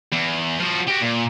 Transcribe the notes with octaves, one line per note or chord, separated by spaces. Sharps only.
E2
F3 F#4
F#4 G4
A#2